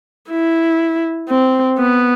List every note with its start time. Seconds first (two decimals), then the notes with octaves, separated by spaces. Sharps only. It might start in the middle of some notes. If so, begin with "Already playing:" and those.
0.31 E4
1.29 C4
1.78 B3